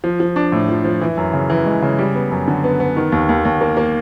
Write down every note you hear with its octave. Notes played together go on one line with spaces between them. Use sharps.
F3
F3
D4
A2
F3
F3
E3
F#2
C#3
E3
G#3
C#3
G3
B3
F#2
D3
B3
B3
D#3
D#2
D#2
D#2
A#3
A#3